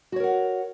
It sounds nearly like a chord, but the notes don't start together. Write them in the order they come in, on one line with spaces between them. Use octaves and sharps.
F#4 C#5 A#4 F#5